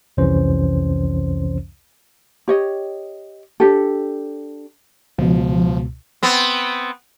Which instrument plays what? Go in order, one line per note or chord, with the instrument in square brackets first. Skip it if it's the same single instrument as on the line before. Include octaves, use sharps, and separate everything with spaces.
[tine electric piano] C2 F2 C3 E3 C#4 C5
[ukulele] G4 C#5 D#5
D4 G4 A4
[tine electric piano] C#2 B2 [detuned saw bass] F3
[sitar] B3 C4